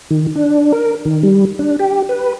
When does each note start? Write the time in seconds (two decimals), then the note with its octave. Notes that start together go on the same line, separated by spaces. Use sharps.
0.11 D#3
0.35 D4
0.72 A#4
1.05 D#3
1.23 G3
1.59 D4
1.79 G4
2.09 B4